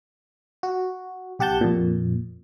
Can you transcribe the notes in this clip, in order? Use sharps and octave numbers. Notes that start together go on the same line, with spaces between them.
F#4
B1 G4 F#5 A5 G6
F2 A#2